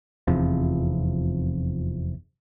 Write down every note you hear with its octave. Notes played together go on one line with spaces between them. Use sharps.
F1 E2 C3 F3